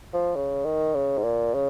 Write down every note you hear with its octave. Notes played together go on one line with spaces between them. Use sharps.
F3
C#3
D#3
C#3
G#2
A#2
C#3